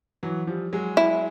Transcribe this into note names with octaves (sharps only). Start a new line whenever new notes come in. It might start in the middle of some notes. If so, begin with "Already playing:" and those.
E3 F#3
F3 G3
F#3 G#3
E4